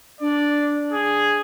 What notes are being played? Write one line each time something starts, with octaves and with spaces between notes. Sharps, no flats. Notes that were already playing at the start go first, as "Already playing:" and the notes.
D4 D5
G#4